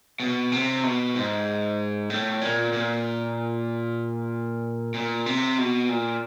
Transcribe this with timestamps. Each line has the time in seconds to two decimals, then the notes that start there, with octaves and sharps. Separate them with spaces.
0.20 B2
0.52 C3
0.83 B2
1.15 G#2
2.10 A2
2.41 A#2
2.73 A#2
4.94 A#2
5.26 C3
5.58 B2
5.89 A#2